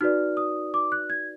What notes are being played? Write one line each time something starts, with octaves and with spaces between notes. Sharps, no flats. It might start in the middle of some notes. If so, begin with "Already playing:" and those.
D#4 F#4 B4 D5 F6
D#6
D6
F#6
G#6